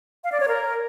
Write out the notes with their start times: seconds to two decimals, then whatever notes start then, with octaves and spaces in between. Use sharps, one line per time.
0.24 F5
0.32 D5
0.40 C#5
0.48 A#4